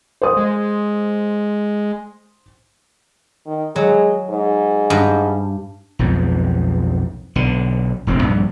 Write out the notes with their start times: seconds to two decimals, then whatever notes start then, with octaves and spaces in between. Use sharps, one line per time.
0.22 C5 D#6
0.37 G#3
3.46 D#3
3.76 F#3 G#3
4.30 G#2
4.90 G2
5.99 B1 F2 G#2
7.36 B1 D3
8.07 E1 A1 C4
8.22 A#1 G2